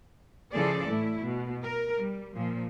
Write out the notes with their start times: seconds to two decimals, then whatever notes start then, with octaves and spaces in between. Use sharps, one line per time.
0.53 C#3 E3 F3 G#4 A4 D5
0.89 A2 A3 E4
1.23 B2
1.63 A#4
1.97 G3
2.36 A#2 F3